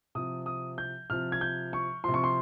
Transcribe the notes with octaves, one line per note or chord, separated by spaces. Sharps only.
C3 F3 D#6
D#6
G6
C3 F3 F6
G#6
G6
C#6
C3 F3 C6
C#6
C6